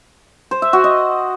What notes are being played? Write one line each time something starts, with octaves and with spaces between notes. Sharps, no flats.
C5
E5
F#4
D#5